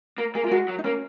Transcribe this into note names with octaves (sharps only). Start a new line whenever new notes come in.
A#3 A#4
A#3 G#4
F4
A#3
G#3 F#4
F#3
D#4
A#3 C#4